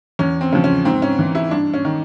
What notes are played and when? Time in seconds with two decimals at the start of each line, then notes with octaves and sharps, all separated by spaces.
0.19 E2 C#4
0.41 C4
0.52 C#3 F3
0.64 C#4
0.85 G#2 C4
1.02 C#4
1.19 E3
1.35 E4
1.51 G2 D4
1.74 C#4
1.85 D#3